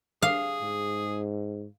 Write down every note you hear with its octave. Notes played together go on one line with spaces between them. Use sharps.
G#4 F5
G#2